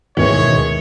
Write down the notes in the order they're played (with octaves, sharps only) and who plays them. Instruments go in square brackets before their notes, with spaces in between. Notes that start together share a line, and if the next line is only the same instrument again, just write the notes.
[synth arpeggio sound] D2 G#2 B2 [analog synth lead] D#3 [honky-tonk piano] E3 G#3 [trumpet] C#5